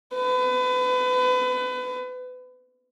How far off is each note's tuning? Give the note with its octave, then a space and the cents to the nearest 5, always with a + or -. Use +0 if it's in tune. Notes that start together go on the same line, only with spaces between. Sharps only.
B4 +30